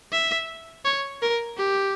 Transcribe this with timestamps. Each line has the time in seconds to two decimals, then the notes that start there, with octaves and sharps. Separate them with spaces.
0.12 E5
0.85 C#5
1.22 A#4
1.57 G4